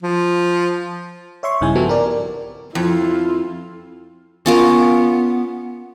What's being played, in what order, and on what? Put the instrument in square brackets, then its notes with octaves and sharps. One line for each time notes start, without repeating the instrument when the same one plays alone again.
[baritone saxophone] F3
[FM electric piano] C#5 E5 C6 C#6
A#1 G2 C#3 D#4 E4 G#5
F3 B3 C4 F#4 G4 A4
A#4 D5
[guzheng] F2 [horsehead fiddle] E4 F4
[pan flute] B3 [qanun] C#4 F4 A#4